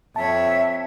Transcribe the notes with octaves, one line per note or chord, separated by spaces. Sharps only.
F2 C#5 E5 A5